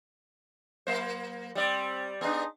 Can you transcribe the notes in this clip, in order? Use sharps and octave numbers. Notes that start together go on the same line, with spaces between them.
F#3 A#3 C5
G3 C4 D5
B3 D4 D#4 G#4 C6